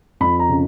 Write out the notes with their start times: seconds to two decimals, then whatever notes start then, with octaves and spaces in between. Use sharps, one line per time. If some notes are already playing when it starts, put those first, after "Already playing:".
0.20 F2 B5
0.39 A#5
0.49 C#3